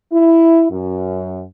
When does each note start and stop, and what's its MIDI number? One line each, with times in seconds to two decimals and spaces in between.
0.12 0.67 64
0.71 1.43 42